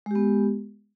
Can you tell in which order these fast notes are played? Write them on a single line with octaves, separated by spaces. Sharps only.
G#3 G4 B3